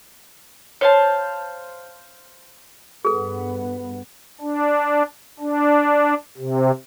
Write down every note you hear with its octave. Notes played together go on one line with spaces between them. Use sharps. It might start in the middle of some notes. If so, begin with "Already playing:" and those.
C5 C#5 F5 A5
G2 B3 G#4 A4
D4
D4
C3